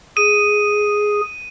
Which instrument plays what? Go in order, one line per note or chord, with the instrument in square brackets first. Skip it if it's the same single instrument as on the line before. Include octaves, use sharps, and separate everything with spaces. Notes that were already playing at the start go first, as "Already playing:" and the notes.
[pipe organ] G#4 [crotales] D#7